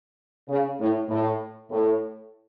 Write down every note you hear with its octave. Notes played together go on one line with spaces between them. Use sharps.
C#3
A2
A2
A2